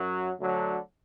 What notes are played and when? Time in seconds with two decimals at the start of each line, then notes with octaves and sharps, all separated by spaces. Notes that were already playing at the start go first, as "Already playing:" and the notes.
Already playing: F#2 F#3
0.39 D2 D3 F#3